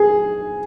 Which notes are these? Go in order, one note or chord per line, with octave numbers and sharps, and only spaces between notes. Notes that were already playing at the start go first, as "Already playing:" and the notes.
Already playing: G#4